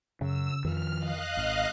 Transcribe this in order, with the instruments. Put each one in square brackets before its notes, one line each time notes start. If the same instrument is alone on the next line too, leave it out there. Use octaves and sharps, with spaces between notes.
[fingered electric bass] F#2 [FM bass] C#3 [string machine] E6
[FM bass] F2 [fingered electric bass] D#3 F3 [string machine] F6
[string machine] D#5 F5 F#6
[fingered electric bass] G#1